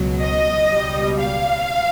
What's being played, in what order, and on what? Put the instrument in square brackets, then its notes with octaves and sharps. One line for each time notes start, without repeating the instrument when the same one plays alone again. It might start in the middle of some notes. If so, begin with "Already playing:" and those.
Already playing: [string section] C#2 B2 F#3
D#5
C#2 B2 G3
F5